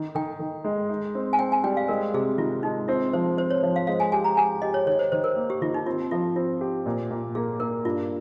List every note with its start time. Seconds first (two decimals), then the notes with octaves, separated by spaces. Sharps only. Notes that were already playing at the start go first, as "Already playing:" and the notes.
Already playing: D#3
0.15 D#3 G5
0.40 D#3
0.64 G#3
0.89 D#4
1.15 C4
1.33 G#5
1.39 C4 G5
1.52 G#5
1.64 G3 G5
1.77 F5
1.88 G#3 A#4
2.14 C3 G#4
2.38 D#3 F4
2.63 G#3 D#4
2.88 C4 F4
3.13 F3 C5
3.37 C4 C5
3.50 C#5
3.63 F3
3.76 F5
3.87 G#3 F5
4.00 G#5
4.12 G4 G#5
4.24 A#5
4.37 G4 G#5
4.62 G4 D#5
4.74 C#5
4.87 D#3 C#5
4.99 C5
5.12 D#3 C5
5.24 A#4
5.36 A#3
5.50 G4
5.62 D#3 F4
5.74 D#4
5.86 C4 F4
6.11 F3 F4
6.36 C4 F4
6.61 G4
6.86 A#2
7.11 A#2
7.35 A#3 G#4
7.60 A#3 A#4
7.85 G2 F4